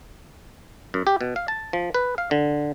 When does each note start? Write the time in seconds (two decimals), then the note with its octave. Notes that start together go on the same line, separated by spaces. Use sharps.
0.94 F#2
1.07 G4
1.21 B2
1.36 F5
1.48 A5
1.73 F3
1.94 B4
2.18 F5
2.31 D3